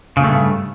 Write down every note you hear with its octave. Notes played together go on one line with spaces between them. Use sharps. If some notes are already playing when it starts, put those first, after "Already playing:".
G2 A#2 C#3 A3